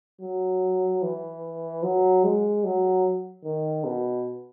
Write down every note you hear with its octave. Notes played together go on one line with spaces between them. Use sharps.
F#3
E3
F#3
G#3
F#3
D#3
B2